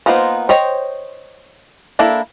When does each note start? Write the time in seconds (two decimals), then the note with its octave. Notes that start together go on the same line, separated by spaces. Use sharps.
0.06 A#3 B3 D#4 F4 C5
0.49 C5 C#5 D#5 G5
1.99 A#3 D4 E4 A4